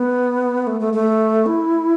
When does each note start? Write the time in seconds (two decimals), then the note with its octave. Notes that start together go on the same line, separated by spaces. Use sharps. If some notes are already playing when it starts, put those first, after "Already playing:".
Already playing: B3
0.67 A3
0.80 A3
0.94 A3
1.46 E4